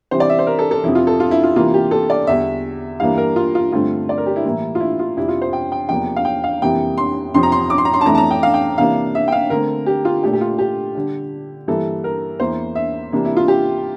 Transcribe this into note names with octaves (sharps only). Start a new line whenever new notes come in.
C3 E3 G3 C4 C5
D5
E5
C5
A#4
A4
A4
F2 C3 F3 E4
F4
A4
F4
E4
F4
C3 E3 A#3 F4
G4
A4
D5
E2 D3 G3 E5
G2 E3 G3 A#3 D4 F5
A#4
F4
F4
G2 D3 A3 C4 F4
D5
A#4
G4
E4
A2 E3 G3 A#3
F4
E4
F4
F2 C3 G3 D4 E4
F4
C5
G5
G5
E2 C3 F3 A#3 D4 G5
F5
G5
F5
F2 C3 E3 G3 A#3 G5
C6
F2 C3 F3 C4 C6
A#5
C6
D6
C6
A#5
C6
A5
F2 E3 A3 D4 A#5
A5
A#5
G5
F5
G5
C3 E3 A#3 D4 F5
E5
G5
F5
D3 A3 C4 A#4
G4
F4
A#2 A3 D4 G4
G4
F4
G4
D3 G3 D4
G2 E3 G3 A#3 A4
A#4
E2 E3 A#3 C5
E5
C3 E3 G3 A#3 D4
E4
F4
G4